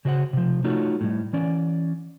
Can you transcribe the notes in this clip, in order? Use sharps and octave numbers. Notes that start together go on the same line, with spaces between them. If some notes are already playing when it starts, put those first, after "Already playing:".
C#3 F#4 C5 C#5 F#5
C3 F3
A3 D#4 F4 F#4 A4 C#5
A2 G3
E3 C#4 D5